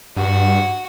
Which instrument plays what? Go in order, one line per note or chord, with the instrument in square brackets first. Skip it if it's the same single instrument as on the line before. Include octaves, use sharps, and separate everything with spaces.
[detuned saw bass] G2 [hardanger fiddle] F#4 F#5